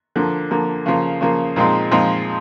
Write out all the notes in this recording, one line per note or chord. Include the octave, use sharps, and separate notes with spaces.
D3 F3 A#3
D3 F3 A#3
C#3 F3 A#3
C#3 F3 A#3
A#2 F3 G#3 C4 D#4
A#2 F3 G#3 C4 D#4